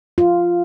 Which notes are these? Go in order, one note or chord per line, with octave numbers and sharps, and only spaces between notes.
F4